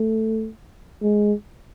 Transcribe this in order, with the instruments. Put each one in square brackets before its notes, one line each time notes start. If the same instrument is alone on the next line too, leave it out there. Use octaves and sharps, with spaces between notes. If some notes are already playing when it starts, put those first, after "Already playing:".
Already playing: [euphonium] A3
G#3